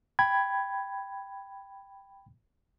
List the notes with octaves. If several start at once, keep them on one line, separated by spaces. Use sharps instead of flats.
G5 B5 G#6